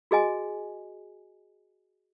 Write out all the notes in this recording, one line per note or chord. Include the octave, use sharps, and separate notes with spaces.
F#4 G#4 D#5 G#5